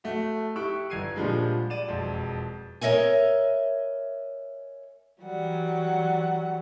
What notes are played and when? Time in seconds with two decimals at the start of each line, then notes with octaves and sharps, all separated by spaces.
0.04 A3 F#4
0.56 E4 G4 C#6 E6 F#6 D7
0.90 G1 G#6 C7 D#7
1.16 A#2 D3 F3 G3 G#3
1.70 D5 D#7 E7
1.88 E1 F2
2.81 A#4 C#5 D#5 E5 G#5
5.22 E3 F#3 G3 F#5